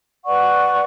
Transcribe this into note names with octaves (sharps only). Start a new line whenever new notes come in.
B4 D5 F#5 C#6